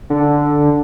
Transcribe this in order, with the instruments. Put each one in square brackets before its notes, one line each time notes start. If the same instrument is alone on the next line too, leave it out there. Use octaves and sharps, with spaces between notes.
[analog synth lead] D3